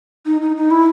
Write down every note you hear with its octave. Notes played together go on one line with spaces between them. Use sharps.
D#4
D#4
D#4
E4